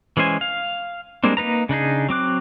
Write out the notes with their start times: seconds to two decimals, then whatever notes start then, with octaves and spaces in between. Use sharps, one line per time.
0.17 E3 G#3 C#4 C5 G#5
0.41 F5
1.24 G3 G#3 A#3 C4 D4
1.37 A#3 D#4 B4 A#5
1.69 C#3 D4 D#4 G#4
2.09 F#3 C4 D6 F#6